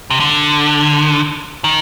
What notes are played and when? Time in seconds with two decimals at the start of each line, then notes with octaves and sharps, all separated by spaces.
0.10 C3
0.20 D3
1.64 D#3